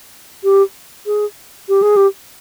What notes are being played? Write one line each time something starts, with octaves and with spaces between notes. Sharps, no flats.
G4
G#4
G4
G#4
G4